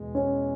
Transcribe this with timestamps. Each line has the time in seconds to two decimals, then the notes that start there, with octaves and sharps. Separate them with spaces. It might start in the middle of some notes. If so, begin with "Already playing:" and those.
Already playing: E2 B2 G#3
0.15 C#4